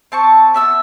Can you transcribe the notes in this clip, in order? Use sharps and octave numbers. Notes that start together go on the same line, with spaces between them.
C4 A5 C#6
B3 E5 E6